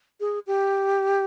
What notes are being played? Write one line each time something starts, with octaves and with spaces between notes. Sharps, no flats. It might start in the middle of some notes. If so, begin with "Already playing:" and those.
G#4
G4